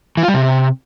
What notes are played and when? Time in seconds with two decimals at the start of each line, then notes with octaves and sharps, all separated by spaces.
0.17 E3
0.23 F4
0.28 G3
0.34 C3